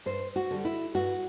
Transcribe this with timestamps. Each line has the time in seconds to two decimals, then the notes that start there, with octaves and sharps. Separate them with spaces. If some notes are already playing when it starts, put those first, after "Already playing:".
0.06 G2 C5
0.36 F#4
0.51 D3 G3
0.65 E4
0.95 G2 F#4